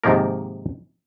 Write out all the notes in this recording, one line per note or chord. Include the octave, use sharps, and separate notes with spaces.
G#2 C3 D#3 F3 A#3 A#4